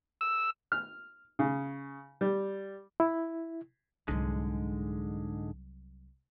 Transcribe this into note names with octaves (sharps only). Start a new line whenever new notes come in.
E6
F6
C#3
G3
E4
C2 G#2 D3 F#3 G#3